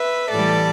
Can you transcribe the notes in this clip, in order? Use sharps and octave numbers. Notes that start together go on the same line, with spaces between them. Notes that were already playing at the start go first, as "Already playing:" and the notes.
Already playing: B4 E5
A2 E3 G3 A4 D5